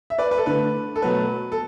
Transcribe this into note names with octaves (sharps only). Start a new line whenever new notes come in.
E5
B4 D5
B4
A4
D3 A3 B4
A4
B2 F#3 A3 B4
A4